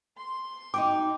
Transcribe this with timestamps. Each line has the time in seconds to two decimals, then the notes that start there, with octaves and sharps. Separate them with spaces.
0.17 C6
0.74 D#4 F#4 G5 D6